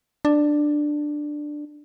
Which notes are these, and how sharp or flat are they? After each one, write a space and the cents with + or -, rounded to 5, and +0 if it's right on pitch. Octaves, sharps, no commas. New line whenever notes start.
D4 +10